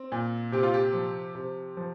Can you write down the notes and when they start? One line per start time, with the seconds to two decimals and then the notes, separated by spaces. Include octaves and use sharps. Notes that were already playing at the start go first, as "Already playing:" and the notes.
Already playing: C4
0.12 A#2
0.52 C3 G4
0.63 F4
0.74 G4
0.93 F3
1.35 C3
1.77 F3